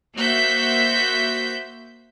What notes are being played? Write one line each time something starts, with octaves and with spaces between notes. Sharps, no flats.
A#3 F#4 C5 E5 G6 B6